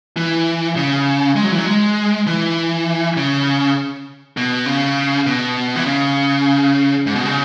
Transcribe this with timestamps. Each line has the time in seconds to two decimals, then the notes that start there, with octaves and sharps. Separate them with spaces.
0.17 E3
0.76 C#3
1.36 G#3
1.44 F#3
1.52 E3
1.59 F#3
1.67 G#3
2.27 E3
3.17 C#3
4.37 B2
4.66 C#3
5.26 B2
5.76 E3
5.86 C#3
7.07 G#2
7.15 B2
7.25 C#3